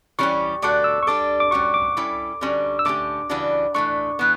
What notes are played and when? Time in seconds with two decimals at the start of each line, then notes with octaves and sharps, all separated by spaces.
0.19 E3 G3 C#4 G4 C#6
0.62 D3 A3 D4 F#4 A4 D6
0.84 E6
1.03 C#6
1.07 G3 D4 A4 D6
1.40 D6
1.51 G3 C#4 F#4 C#6
1.74 D6
1.97 G3 C#4 E4 A4
2.41 D3 G3 C#4 F#4
2.79 E6
2.85 D3 A3 C#4 G4 D6
3.29 C#3 E3 G3 D4 F#4
3.74 E3 A3 D4 C#6
4.19 E3 B3